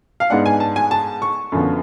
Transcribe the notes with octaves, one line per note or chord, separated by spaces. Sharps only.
F5
G#2 G#3 B3 D4 F#5
G#5
A5
G#5
A5
C#6
F#2 D3 F3 B3